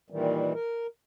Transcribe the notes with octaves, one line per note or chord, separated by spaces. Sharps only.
A#2 D#3 E3 G3
A#4